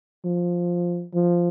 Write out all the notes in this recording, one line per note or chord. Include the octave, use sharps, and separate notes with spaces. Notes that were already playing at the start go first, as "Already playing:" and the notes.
F3
F3